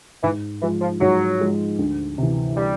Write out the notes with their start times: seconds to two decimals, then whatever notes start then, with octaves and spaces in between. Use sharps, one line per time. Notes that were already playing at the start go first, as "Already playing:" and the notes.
0.23 G#2 E3
0.62 E3 F3 G#3
0.81 F3
1.01 G#2 F#3
1.40 F3 G#3
1.79 D2
2.18 C3 E3
2.57 G3